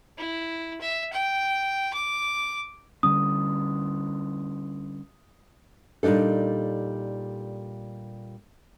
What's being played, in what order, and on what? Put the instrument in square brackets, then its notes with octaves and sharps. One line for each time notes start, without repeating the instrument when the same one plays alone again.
[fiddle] E4
E5
G5
D6
[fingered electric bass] D3 G3 C#4 [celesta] D#6
[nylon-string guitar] A#2 G3 D4 D#4 A4